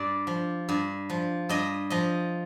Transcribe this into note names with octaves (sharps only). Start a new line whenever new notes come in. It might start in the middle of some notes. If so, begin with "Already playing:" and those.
Already playing: G2 D5
F3
G2
F3
G2 D#5
F3 D#5